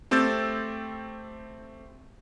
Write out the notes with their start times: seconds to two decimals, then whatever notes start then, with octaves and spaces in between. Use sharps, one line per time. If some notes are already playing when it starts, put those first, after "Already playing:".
0.11 A3 C4 G4 E6 G6 A6